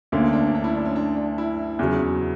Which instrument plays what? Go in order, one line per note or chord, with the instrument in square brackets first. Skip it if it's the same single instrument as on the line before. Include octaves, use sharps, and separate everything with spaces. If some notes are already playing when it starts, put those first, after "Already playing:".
[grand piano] D2 D3 A#3 [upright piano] C#4
[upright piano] D4
C#4
D4
E4
D4
C#4
D4
D4
E4
[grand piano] E2 C#3 F#3